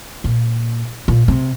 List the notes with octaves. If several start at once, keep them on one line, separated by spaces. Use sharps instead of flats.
A#2
A#2
C3